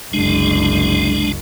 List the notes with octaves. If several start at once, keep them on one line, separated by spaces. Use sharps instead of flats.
F#1 C2 G#3 D4